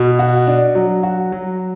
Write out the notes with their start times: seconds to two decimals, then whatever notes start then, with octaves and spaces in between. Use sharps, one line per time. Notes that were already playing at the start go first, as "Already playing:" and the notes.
Already playing: B2
0.19 F#4
0.47 D4
0.75 F#3
1.03 F#4
1.32 F#3